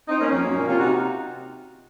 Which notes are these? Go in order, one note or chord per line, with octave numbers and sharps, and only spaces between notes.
C4 D#4
A#3 C#4
F2 A#3 C#4
F#2
A#2
C3 C#4 F4
D#4 F#4